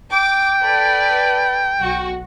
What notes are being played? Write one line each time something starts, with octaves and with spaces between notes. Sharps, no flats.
G5 D6
A4 B4 D5
B1 F#4